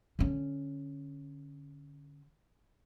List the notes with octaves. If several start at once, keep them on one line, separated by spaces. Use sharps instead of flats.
D3 C#4